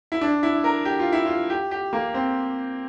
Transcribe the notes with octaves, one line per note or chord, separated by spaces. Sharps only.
E4
D4
E4
A#4
G4
F4
E4
F4
G4
G4
A#3
C4